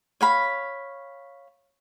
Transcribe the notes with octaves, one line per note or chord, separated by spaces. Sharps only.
C#5 F5 B5